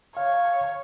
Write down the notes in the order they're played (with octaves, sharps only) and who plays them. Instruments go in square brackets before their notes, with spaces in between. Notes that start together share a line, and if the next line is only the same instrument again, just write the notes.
[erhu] C#5 [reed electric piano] F5